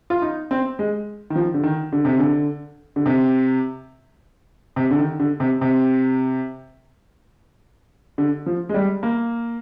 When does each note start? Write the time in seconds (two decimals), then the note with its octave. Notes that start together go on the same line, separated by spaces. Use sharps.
0.10 F4
0.22 D#4
0.51 C4
0.79 G#3
1.30 D#3
1.35 F3
1.54 D3
1.63 D#3
1.92 D3
2.05 C3
2.19 D3
2.96 D3
3.06 C3
4.76 C3
4.91 D3
4.98 D#3
5.20 D3
5.40 C3
5.61 C3
8.18 D3
8.46 F3
8.69 G#3
8.74 G3
9.03 A#3